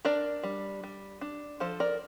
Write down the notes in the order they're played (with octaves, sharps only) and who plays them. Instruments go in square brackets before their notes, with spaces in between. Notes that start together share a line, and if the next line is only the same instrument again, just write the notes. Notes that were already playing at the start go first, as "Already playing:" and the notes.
[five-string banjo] D4 A#4 D5
G3
G3
D4
F3 A4 C5
A#4 D5